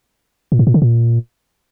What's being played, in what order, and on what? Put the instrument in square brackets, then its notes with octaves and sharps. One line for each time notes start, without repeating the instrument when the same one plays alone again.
[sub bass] A#2
A2
A#2
D3
A#2